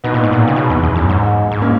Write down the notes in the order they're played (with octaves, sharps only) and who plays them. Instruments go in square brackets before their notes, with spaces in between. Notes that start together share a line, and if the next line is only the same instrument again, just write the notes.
[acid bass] B2 [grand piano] B3 D#4
[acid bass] A#2
G#2
A#2
C#3
B2
E2
E2
F#2
G#2
G#2
[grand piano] A#3 C#4